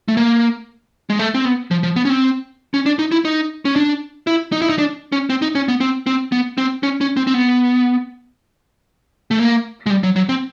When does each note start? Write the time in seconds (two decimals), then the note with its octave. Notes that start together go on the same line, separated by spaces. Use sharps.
0.08 A3
0.17 A#3
1.10 G#3
1.19 A3
1.34 C4
1.45 B3
1.71 F3
1.83 F3
1.96 B3
2.05 C#4
2.10 C4
2.74 C#4
2.86 D4
2.99 D#4
3.12 E4
3.25 D#4
3.65 C#4
3.76 D4
4.27 E4
4.52 D#4
4.62 E4
4.69 D#4
4.78 D4
5.12 C#4
5.30 C4
5.42 D#4
5.55 C#4
5.68 B3
5.80 C4
6.07 C4
6.32 B3
6.58 C4
6.83 C#4
7.01 C#4
7.17 C4
7.27 C4
7.34 B3
9.31 A3
9.39 A#3
9.86 G#3
9.90 G3
10.03 F#3
10.16 F#3
10.29 C4